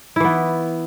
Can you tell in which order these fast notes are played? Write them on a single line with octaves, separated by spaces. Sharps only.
E4 E3 B3